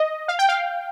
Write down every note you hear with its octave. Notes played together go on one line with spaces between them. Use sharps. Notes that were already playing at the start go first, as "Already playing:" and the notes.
Already playing: D#5
F5
G5
F5